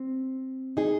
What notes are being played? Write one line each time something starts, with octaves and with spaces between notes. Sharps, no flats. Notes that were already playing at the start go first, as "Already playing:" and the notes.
Already playing: C4
D#4 G#4